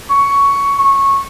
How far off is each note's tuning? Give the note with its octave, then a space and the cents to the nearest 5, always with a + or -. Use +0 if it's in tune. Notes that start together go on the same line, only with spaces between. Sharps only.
C#6 +10
C#6 -15